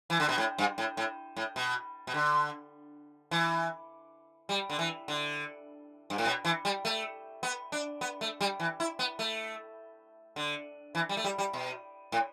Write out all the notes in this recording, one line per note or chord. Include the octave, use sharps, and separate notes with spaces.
E3
D3
B2
A2
G2
A2
A2
A2
B2
B2
D3
E3
G3
D3
E3
D3
G2
A2
B2
E3
G3
A3
B3
D4
B3
A3
G3
E3
E4
B3
A3
D3
E3
G3
A3
G3
G3
B2
A2